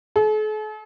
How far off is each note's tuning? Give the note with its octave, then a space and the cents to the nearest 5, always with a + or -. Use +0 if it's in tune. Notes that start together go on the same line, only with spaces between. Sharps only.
A4 -45